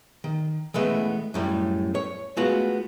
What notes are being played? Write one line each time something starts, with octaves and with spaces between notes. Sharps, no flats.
D#3
E3 G#3 A3 B3
F#2 A2 G3
C#5
G#3 A3 B3 F4 F#4